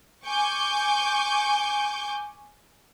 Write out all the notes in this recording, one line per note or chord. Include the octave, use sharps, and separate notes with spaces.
G#5 C#6 D6 G6